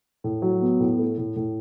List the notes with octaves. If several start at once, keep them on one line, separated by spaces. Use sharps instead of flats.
A2
F#3
B3
A2
A3
A2
A2